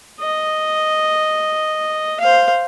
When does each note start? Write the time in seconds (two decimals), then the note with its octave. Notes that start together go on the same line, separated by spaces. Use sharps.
0.21 D#5
2.20 C5 F5